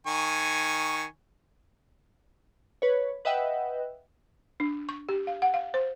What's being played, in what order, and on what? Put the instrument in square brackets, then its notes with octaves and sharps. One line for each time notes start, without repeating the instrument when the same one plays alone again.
[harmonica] D#3 G#5 C#6
[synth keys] B4 C#5
B4 D#5 E5 F#5 G5
[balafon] D4
C#6
G4
F5
F#5
F5
C5